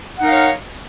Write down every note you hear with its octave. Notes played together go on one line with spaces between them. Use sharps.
D#4 A#4 C#5 F5 F#5